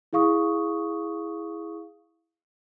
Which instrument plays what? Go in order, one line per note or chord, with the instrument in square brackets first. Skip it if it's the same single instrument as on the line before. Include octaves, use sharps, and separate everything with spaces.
[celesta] E4 G#4 F5 C#6 D#6